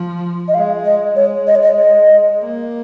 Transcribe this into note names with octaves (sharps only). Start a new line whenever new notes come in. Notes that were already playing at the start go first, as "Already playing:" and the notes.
Already playing: F3
D#5
G#3 F5
D#5
G#3 C#5
D#5
C#5
D#5
D#5
A#3